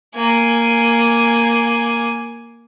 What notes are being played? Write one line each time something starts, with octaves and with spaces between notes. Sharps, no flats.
A#3 G#5